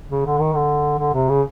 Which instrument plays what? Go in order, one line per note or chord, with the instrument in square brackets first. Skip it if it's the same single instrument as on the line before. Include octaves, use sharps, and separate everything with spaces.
[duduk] C#3
D3
D#3
D3
D3
C3
C#3